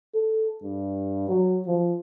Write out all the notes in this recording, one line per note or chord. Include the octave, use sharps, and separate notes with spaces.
A4
G2
F#3
F3